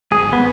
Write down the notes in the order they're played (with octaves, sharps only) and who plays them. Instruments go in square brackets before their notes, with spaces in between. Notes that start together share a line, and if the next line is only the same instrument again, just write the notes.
[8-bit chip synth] G#1 G#2 [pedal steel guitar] G#4
[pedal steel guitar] B3